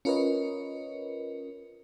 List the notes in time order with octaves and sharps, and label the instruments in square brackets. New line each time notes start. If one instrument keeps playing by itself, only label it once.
[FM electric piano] C#4 F4 A#4 B4 C#5 D#5